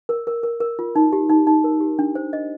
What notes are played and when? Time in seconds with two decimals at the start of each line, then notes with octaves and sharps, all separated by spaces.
0.09 A#4
0.27 A#4
0.43 A#4
0.60 A#4
0.79 F4
0.96 D#4
1.12 G4
1.29 D#4
1.47 D#4
1.64 A#4
1.80 G4
1.99 D4
2.15 C5
2.33 D#5